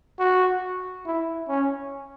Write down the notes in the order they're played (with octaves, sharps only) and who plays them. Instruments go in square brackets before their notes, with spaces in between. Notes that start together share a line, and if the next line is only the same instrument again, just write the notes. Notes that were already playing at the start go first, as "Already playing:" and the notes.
[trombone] F#4
E4
C#4